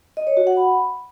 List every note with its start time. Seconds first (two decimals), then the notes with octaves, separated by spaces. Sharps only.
0.17 D#5
0.27 C#5
0.37 F#4
0.47 F#5
0.57 B5